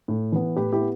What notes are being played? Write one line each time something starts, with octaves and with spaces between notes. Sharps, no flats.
A2
E3 B3
A2 G4 B4
E4 G4
B3